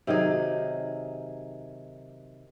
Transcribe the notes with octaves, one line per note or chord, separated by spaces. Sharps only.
C3 D#3 F#3 G#4